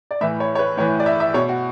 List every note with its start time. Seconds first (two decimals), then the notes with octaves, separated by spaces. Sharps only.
0.11 D5
0.21 A2 E3 E5
0.40 C#5
0.55 C#5
0.59 B4
0.77 A2 E3 C#5
1.00 D5
1.06 E5
1.20 E5
1.34 B2 C#5
1.49 F#4